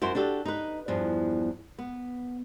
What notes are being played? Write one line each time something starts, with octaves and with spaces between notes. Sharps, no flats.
F#2 E4 F#4 C5
D4 F#4 G4 A4
D#4 B4
E2 G2 F3
B3